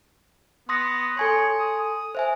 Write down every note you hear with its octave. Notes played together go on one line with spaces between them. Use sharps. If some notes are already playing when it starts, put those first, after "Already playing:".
B3 C6 D#6 A#6
A4 C#5 G#5 C6
D#6
C5 E5 G#5